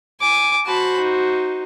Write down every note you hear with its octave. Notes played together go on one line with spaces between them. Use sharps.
G#5 D6
F#4 C5 A5 B5
D#4